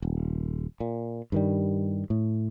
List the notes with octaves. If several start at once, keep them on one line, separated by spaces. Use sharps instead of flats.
D#1
A#2
G2 D#3 G3
A2